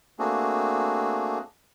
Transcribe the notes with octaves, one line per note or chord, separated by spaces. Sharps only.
A3 A#3 C4 D4 F#4 G#4